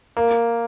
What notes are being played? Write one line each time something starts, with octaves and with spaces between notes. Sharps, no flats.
A#3